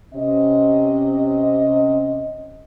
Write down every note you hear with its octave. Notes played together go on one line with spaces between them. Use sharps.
C3 C#4 D#5